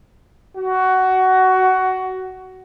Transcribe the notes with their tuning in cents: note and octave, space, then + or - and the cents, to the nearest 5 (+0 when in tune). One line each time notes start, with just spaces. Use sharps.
F#4 +15